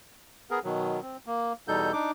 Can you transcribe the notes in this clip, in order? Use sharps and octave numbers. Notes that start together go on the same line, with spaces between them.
B3 G#4 A#4
B2 D#3 F#3
C4
A#3
E2 B2 G3 D#4 A4 G6
D4 D#4 D6